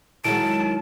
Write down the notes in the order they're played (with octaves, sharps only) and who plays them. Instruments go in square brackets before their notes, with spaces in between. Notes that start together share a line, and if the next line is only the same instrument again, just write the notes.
[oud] D#3 F#3 G#3 [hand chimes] E4 D7 [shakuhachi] A5